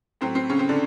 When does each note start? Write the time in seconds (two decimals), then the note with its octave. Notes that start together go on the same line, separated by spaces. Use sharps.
0.21 A2 F#3 C4
0.35 C4
0.49 C#3 C#4
0.59 C4
0.69 D3 D4